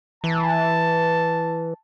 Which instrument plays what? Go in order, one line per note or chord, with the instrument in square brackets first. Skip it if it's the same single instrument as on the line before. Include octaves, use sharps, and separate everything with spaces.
[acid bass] E3 [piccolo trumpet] A5